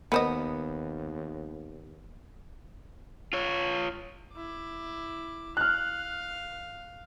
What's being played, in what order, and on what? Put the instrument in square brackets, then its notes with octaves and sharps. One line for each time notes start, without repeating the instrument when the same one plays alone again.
[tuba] D#2 [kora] B3 [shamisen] A#4 C5 D#5
[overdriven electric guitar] F4 C#5
[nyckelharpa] E4 D6
[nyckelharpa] F5 [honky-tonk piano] F6 F#6